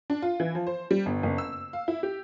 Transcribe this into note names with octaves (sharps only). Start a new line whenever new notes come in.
D4
F4
E3
F3
C5
G3
G1
F#1
E6
F5
E4
G4